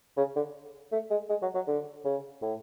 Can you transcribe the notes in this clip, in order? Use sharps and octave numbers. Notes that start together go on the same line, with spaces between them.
C#3
D3
A3
G#3
G#3
F#3
F#3
D3
C#3
A2